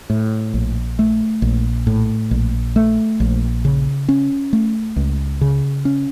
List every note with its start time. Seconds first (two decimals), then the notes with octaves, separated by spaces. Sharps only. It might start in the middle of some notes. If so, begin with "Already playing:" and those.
0.10 A2
0.54 A#1
0.99 A3
1.42 A#1
1.87 A2
2.31 A#1
2.76 A3
3.20 A#1
3.65 C#3
4.09 C#4
4.53 A3
4.96 C#2
5.41 C#3
5.85 C#4